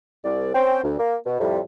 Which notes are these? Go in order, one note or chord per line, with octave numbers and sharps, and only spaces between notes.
C2 D5
C4 C#4 C5 G5
D2
A#3
B2
F2 A2 C3 G3